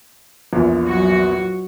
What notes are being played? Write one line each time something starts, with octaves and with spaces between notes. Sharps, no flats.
A#1 E2 A#2
F#3 F#4